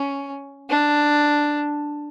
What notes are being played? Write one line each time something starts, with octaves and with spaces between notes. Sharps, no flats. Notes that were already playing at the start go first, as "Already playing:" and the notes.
Already playing: C#4
D4